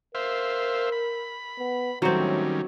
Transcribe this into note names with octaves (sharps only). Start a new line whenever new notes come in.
A#4 C5 E5 F5
B5
B3
A2 D#3 F#3 G3 C4 C#4